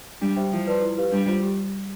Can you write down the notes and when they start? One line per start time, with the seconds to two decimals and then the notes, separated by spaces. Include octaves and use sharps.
0.21 G3 D4
0.36 G4 C5 E5 G5
0.52 F3 E4
0.67 B4 D5 A5 C6
0.82 E4
0.98 G4 B4 F5
1.12 G3 D4
1.28 F4 C5
1.42 G4